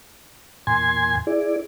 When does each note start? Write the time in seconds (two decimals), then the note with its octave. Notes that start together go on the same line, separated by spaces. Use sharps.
0.67 E2 A#2 G#5 C6 G#6
1.27 E4 G#4 D5